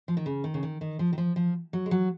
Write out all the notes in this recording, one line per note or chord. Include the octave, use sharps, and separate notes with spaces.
F3
D#3
C#3
D#3
C#3
D#3
D#3
F3
D#3
F3
F3
F#3
G#3
F#3